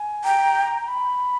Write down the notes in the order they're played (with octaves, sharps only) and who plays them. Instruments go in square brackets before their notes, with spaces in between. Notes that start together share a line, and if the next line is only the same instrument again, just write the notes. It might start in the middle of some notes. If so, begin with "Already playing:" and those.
Already playing: [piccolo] G#5
[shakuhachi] G5 [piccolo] A#5
[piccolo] A#5
B5